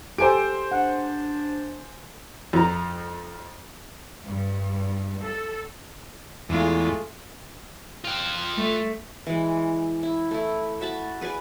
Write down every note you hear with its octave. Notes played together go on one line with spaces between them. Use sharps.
G4 A4 C5 G#5 D7
D4 F#5
F2 F3 A#5
G2
A4
E2 G#3 A3 F4
F4 G5
A3
E3 G#3
E4
A3 E4
F#4 E5 A5 B5
G#4 B4 D5 G#5